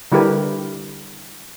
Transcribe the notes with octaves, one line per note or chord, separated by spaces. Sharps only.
D3 G3 E4 G4 A#4 B4